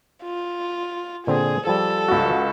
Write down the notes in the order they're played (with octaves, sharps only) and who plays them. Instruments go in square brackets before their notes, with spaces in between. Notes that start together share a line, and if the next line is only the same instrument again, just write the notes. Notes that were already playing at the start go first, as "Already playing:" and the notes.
[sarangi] F4
[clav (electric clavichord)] A#2 D3 C4 [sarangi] G#4
[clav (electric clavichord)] F3 G3 [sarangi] A4
[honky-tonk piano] C#2 F#4